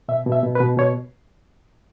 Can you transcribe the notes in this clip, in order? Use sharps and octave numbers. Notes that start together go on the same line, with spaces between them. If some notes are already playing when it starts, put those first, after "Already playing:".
B2 E5
B2
E5
B2
B4
B2
B2 C#5